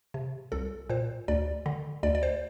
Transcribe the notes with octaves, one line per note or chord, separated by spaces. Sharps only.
C3
C2 A4
A#2 C5
D2 D5
D3
D2 D5
D5
C5